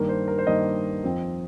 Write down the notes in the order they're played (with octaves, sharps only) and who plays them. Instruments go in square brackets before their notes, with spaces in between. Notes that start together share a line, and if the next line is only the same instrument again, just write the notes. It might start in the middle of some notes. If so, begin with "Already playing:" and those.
Already playing: [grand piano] G2 D#3 A#3 A#4
C5
A#4
C5
G2 D#3 A#3 D#5
F2 F3 C4